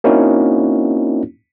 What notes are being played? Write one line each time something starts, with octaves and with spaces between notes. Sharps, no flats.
A#3 C4 C#4 D#4 E4 F#4